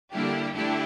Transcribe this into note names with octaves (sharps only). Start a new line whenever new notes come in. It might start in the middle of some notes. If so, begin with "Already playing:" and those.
D3 G3 A#3 D4 E4 G4
D3 A3 D4 E4 G4